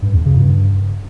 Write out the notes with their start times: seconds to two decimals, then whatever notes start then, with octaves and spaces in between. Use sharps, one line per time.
0.02 G2
0.14 E2
0.25 C#3
0.37 G2